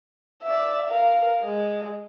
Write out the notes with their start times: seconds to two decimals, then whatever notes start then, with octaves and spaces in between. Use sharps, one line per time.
0.43 D5 E5
0.89 A#4 F5
1.41 G#3